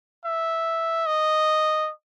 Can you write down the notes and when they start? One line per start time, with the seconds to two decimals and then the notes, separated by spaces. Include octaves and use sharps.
0.25 E5
1.06 D#5